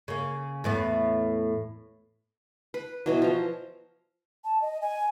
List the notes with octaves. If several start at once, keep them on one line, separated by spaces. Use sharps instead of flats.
C#3 A#3
E2 A2 B3
B4
B2 E3 F#3
F3 A#5
A5
D#5
G#5